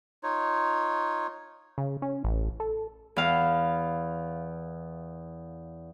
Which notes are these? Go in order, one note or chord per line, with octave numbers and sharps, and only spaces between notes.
D#4 F4 C#5
C#3
C#4
A1
A4
E2 F5